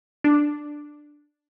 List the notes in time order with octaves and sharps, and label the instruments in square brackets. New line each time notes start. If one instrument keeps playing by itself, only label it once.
[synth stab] D4